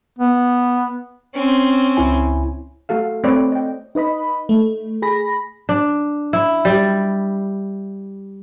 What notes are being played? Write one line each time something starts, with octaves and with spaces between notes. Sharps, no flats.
B3
C4 C#4
C#2 E4 G#5
A3 F#4 A4 F5
A3 C4 B4 C#5 D5
D#5 G5
D#4 B4 D#5 B5
A3
G#4 B5 A#6
D4
E4
G3